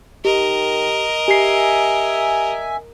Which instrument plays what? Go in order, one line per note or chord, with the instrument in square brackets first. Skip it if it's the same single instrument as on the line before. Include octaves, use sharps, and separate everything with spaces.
[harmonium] D#3 [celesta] G4 [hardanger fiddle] A#4 D#5
[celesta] G4 C7 [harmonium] E5 G#5